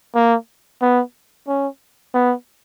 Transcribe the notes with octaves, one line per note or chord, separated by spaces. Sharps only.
A#3
B3
C#4
B3